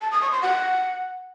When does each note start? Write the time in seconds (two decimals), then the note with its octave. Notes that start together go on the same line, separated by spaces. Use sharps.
0.02 A5
0.12 D#6
0.22 C#6
0.32 C6
0.42 F#5